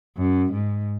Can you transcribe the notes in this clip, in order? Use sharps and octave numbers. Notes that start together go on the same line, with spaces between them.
F#2
G#2